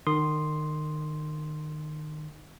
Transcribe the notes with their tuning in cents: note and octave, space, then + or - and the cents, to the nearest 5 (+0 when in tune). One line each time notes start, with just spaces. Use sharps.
D#3 -30 C6 +0 D#6 -20